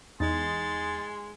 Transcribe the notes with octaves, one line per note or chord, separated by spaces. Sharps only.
E2 G#3 D#4 G#5 C6 A6